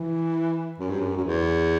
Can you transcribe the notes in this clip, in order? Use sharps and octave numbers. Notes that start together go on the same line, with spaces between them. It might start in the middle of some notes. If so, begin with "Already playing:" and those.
Already playing: E3
F#2
G2
F#2
F#2
E2